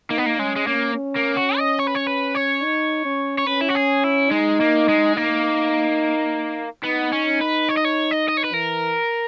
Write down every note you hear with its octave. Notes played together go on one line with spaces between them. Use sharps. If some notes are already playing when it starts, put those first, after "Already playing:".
A#3 D#4
B3
A#3
G#3 C#4
G#3
A#3 C#4
C#4
A#3
F#4
D#5
C#5
B4
C#5
B4
C#5
D#4
C#4
C#5
C#4 B4
E4
F#4
G#4
E4
G#3 D#4
A#3
G#3
A#3 D#4
B3 D#4
C#4
B4
C#5
D#5
C#5
D#5
D#5
C#5
B4
E3 A#4